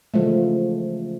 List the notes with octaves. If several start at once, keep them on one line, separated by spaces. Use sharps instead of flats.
C#3 E3 F3 G#3 A3